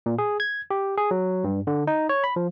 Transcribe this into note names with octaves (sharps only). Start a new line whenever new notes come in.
A#2
G#4
G#6
G4
G#4
F#3
G2
D3
D#4
C#5
B5
F3